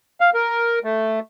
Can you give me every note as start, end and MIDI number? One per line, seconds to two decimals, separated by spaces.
0.21 0.30 77
0.34 0.79 70
0.84 1.20 57